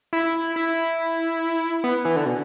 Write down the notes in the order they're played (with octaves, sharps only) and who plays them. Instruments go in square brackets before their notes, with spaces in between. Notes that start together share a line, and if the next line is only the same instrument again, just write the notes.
[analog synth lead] E4
E4
B3
E3
D3
B2